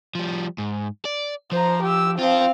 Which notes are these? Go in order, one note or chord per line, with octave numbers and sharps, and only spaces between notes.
F3 G3
G#2
D5
F3 C5 A#5
G4 E6
C4 F4 C5 F5